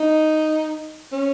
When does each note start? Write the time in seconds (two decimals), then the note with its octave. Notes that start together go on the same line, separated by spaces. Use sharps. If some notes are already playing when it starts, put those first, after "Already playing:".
Already playing: D#4
1.13 C#4